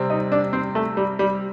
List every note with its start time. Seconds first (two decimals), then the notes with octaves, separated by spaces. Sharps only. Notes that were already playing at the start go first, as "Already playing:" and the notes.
Already playing: C3 G3 C4
0.10 D#4
0.32 D4
0.53 C4
0.75 A3
0.97 G3
1.19 G3